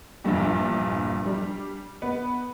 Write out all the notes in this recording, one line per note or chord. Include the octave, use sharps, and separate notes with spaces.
A#1 E2 G2 A#2
G3 D4
B3